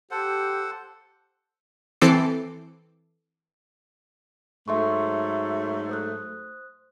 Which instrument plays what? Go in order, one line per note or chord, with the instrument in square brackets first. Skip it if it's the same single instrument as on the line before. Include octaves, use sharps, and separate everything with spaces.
[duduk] G4 [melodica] A4 C5 F#5
[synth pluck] E3 C4 A4 D6 C7
[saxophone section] G#2 F#3 A3 [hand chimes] E5 C6 C#6
[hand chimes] C5 D#6 F#6